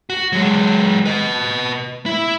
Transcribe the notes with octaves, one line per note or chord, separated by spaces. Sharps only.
F#4
F#3 G#3
B4 D#5
E4